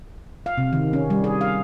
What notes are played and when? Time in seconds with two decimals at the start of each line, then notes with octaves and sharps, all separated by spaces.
0.46 F5
0.58 C3
0.73 D#3
0.93 C#4
1.10 G3
1.24 G#4
1.41 F5